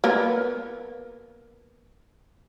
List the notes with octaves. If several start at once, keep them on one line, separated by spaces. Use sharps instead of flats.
A#3 B3 A#4